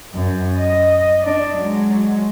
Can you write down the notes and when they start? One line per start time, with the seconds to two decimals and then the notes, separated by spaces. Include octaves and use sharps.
0.14 F#2
0.58 D#5
1.23 D4
1.58 F#3 G#3